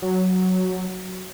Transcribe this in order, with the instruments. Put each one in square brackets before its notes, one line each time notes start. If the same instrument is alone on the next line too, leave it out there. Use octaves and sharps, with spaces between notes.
[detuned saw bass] F#3